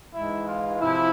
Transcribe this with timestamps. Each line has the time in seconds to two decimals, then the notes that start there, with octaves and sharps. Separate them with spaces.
0.13 G#2 E3 G#3 E4
0.47 F4
0.81 C3 F3 E4